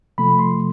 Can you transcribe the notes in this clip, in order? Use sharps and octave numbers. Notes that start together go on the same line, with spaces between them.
C3 F3 A3 B5
C6